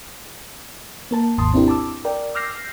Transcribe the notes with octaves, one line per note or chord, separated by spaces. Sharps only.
A#3 A#4 A5
G#1 D#2 G#2 A5 C6 D#6
C4 D4 E4 G4 A#4
A5 D6 E6
A#4 D5 G5
D6 E6 F6 G6 A#6 C7